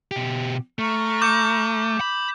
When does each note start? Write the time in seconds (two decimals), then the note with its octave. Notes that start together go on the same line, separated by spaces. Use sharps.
0.11 B2 G4
0.79 A3 A#5 C#6 F6
1.22 D6 G6
2.01 B5